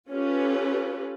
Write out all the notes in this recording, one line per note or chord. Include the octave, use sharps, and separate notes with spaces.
C#4 F4 G4 A4 B4